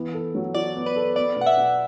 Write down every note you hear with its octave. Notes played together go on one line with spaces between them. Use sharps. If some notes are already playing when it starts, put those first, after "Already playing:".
Already playing: E3 B3
A4
F#3
F#4 D5
B3
B4
A4
B3 D5
B2
F#5
E5
B2